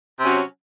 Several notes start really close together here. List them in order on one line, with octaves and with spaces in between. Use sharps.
C3 C#4 F#3